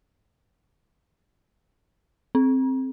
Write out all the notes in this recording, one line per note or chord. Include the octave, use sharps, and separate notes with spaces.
C4